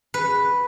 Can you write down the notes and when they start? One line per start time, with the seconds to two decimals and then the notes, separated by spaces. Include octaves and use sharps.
0.14 B4